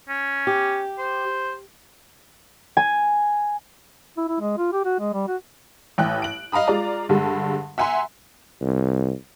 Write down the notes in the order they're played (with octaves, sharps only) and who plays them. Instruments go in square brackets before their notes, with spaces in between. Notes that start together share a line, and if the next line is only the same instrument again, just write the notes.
[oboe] C#4
[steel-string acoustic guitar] G4
[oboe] C5
[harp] G#5
[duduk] E4
E4
G#3
F4
G4
F#4
G#3
G3
F#4
[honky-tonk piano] A1 G5 F#6
D7 F#7
D#5 F5 A#5 B5 D#6
G#3 F4 D5 A#5
G2 D3 G3 G#3
E5 F#5 G#5 A#5 C6
[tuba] C2